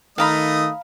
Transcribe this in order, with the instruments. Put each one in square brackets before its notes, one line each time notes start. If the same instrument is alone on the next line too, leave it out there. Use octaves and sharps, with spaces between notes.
[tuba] D#3 [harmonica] A3 D#5 D#6 [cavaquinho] F5 A#5 B5